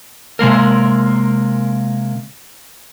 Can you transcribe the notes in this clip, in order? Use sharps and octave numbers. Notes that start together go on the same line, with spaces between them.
C3 G#3 A#3 A#4